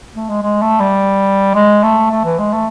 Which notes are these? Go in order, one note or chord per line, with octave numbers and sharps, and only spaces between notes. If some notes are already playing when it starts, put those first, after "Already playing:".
A3
G#3
G#3
A3
G3
G#3
A3
A3
E3
G#3
A3